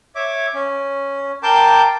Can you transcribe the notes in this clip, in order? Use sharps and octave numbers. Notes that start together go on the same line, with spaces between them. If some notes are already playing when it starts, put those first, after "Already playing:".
C#5 E5 D6
C#4
A#4 G5 A5 C6 D6 G6